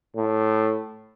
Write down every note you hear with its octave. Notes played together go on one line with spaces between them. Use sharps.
A2